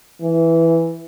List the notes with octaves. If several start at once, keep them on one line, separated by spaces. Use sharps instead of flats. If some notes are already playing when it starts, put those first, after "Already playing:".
E3